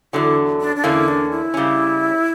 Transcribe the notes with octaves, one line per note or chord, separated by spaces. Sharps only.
E2 D3 F#3 E4
D4
D4
E2 D3 A#3 C#4 E4
D4
E4
C#3 G3 C#4